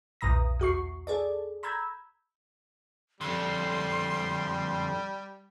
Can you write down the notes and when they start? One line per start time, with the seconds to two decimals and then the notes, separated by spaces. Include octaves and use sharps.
0.21 B1 E2 A#2 A#5 D#6 A#6
0.60 E2 F#4 C#6 C7
1.07 G#4 A4 D5
1.63 A#5 B5 E6 G6 G#6
3.21 F2 D3 G3 C6